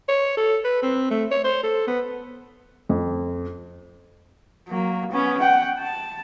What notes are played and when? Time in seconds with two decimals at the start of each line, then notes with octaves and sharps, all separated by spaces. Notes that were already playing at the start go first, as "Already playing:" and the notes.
0.09 C#5
0.37 A4
0.64 B4
0.83 C4
1.11 A3
1.31 C#5
1.44 C5
1.63 A4
1.87 B3
2.89 F2
4.68 F#3 A#3
5.12 B3 C#4
5.41 F#5 G5
5.80 A5